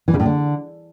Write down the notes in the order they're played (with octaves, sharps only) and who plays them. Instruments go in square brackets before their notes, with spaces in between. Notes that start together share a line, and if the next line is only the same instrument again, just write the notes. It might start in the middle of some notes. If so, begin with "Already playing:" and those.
[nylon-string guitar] E3
C#3
A2
D3